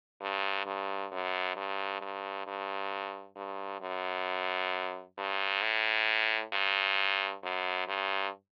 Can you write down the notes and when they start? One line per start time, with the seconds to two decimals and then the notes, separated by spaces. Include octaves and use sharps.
0.21 G2
0.66 G2
1.12 F#2
1.56 G2
2.01 G2
2.47 G2
3.36 G2
3.81 F#2
5.18 G2
5.62 A2
6.53 G2
7.43 F#2
7.88 G2